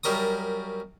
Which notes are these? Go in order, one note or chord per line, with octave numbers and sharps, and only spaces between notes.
F#2 G3 A#4 C#6 D#6